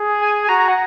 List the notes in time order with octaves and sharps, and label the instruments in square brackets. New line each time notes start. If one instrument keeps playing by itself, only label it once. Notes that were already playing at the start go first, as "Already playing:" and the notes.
Already playing: [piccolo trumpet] G#4
[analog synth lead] G#5
G#5
[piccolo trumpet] F#4 [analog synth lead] A#5
[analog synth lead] A#5
F#5